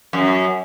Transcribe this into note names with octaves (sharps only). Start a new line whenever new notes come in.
F#2